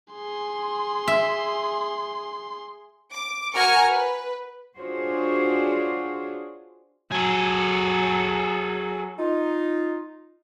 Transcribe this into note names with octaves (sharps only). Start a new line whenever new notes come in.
G#4 C6
E5
D6
F#4 A#4 G#5 A#5 C#6 F6
B4
D4 F4 F#4 G#4 C5 C#5
F#3 G#4 A4
D#4 F4